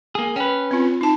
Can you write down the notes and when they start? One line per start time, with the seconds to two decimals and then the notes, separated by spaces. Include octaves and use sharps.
0.15 A#3 G#4
0.36 C#4 B4 G5
0.71 C4 F4
1.01 D#4 A5